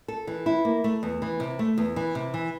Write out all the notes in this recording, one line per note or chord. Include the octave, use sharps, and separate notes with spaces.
A4
E3
E4
A#3
A3
E2
E3
C3
A3
E2
E3
C3
E3